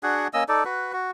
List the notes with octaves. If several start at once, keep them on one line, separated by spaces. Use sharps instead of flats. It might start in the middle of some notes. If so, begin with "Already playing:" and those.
D4 F#4 G#4 F#5
A#3 C#4 D#5 E6
D#4 A4 D5
F#4 B4
F#4